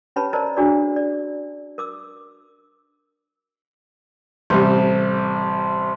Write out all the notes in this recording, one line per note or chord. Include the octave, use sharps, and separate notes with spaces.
C#4 G4 B4 C#5 A5 B5
A#4 C5 D5 D#5 A5 A#5
D4 F#4 G#4 A#4 C#5 D5
D5
A#4 D6 E6
A1 C3 G3 C5